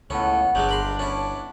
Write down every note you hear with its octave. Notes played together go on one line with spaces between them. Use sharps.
C#2 A2 B3 C#4 F#5
G1 F#3 G#3 D4 D#4 F#6 G6 A#6
A#4 B5 C6
C#4 E4 A4